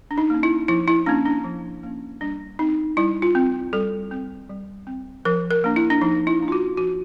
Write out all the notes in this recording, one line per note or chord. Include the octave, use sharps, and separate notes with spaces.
D4
D#4
A#3 C#4
E4
F3 E4
E4
A#3 C#4 D4
D4
F3
A#3 C#4
G3 D4
C4 D#4
G3 E4
F4
C4
G3 A4
C4
G3
C4
F3 A#4
A#4
A#3 D4
E4
D4
F3 D#4
E4
A#3 D4
F4
F#4
F3 F#4